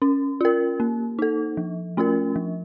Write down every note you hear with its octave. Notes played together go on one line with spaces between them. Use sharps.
C#4
F4 A#4
A#3
D#4 A4
F3
A3 C#4 F4 A#4
F3